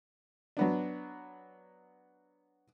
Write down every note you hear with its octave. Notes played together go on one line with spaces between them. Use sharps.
F#3 B3 D4